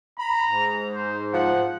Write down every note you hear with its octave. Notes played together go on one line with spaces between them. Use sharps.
A#5 B5
G#2
C5
F3 F#5